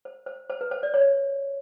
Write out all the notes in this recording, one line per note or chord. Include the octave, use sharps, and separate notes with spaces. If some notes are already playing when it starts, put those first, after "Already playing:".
C5
C5
C5
B4
C5
D5
C#5